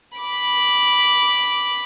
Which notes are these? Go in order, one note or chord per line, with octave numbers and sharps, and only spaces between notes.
B5 D6